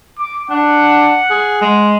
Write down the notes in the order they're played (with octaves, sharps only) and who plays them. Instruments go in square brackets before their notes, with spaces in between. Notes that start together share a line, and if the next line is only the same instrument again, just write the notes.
[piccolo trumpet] D6
[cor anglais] D4 [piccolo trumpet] F#5
[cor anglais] G#4
G#3